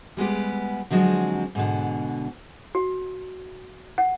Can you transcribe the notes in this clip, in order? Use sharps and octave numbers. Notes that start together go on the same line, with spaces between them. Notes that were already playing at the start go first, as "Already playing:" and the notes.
G3 G#3 B3 G4
D3 F3 F#3 G#3 C4
G#2 B2 D3
F#4
F#5